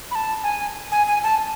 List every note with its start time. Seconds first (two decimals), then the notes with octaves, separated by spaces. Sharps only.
0.11 B5
0.15 A5
0.44 G#5
0.91 G#5
1.07 G#5
1.23 A5